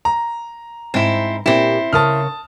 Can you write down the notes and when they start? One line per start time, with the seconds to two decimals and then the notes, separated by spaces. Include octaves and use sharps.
0.05 A#5
0.94 G#2 C4 E4
1.46 A#2 C4 E4 G4
1.93 C#3 A#4 C#5 A5 D#6 F6